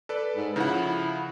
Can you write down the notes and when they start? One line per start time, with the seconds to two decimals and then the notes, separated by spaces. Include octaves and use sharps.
0.09 A4 B4 D5
0.36 G#2
0.56 C#3 F3 E4 F#5